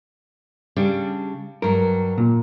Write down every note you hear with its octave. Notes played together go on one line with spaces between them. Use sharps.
C#3 G3 D4
G2 F#3 A#4
A#2